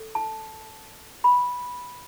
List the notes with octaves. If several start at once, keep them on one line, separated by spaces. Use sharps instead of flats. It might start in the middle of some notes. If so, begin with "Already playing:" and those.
Already playing: A4
A5
B5